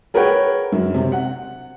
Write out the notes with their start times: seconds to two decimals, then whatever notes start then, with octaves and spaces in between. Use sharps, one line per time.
0.14 G#4 A#4 B4 C#5 F#5 G5
0.72 F#2
0.95 C3
1.12 F#5